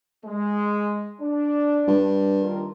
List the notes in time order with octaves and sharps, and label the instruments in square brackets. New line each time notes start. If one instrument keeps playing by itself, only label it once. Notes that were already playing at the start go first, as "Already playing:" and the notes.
[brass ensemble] G#3
D4
[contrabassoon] G2
[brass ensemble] D#2 F4 A#4